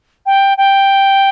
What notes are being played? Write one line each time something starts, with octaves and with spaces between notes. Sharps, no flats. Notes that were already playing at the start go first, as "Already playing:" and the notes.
G5
G5